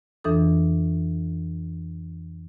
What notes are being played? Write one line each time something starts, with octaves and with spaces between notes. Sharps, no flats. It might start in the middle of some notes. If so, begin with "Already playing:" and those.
F2 E3 D4 A4 D#6